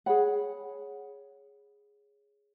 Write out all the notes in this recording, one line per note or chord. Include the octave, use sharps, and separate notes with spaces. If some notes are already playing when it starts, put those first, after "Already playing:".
G#4 C#5 F#5 B5